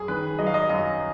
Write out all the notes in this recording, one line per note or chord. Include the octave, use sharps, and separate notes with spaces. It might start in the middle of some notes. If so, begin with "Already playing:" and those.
Already playing: F#2 G#4
D#3 B4
F#3 D#5
F5
D#5
F#2 D#5